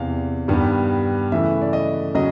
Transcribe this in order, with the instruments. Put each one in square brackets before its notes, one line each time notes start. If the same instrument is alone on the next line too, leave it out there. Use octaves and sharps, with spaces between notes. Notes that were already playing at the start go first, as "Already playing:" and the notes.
Already playing: [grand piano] E2 C3 E3 F5
G2 D#3 G3 B3
C#3 E3 A3 E5
D5
D#5
C#3 F#3 D#5